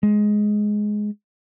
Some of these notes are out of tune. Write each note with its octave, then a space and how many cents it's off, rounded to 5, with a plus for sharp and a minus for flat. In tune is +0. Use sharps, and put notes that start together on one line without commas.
G#3 +10